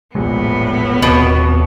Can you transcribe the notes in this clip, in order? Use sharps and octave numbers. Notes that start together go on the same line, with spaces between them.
E1 A#1 A2 G#3 B3
D#2 B2 C4